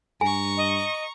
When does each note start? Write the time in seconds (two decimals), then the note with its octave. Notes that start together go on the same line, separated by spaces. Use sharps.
0.21 G2 G#5 A#5 C#6
0.57 D#5